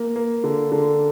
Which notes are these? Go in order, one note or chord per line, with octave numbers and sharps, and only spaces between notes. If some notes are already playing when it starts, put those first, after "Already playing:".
Already playing: A#3
A#3
D3
D3